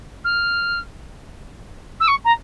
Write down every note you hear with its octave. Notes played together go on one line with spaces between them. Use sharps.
F6
E6
C#6
A#5